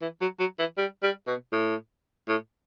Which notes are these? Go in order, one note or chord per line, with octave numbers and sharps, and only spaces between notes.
E3
F#3
F#3
E3
G3
G3
B2
A2
A2